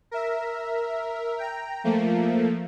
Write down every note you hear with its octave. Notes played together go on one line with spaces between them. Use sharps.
A#4 E5
G5 A#5
F3 A3 A#3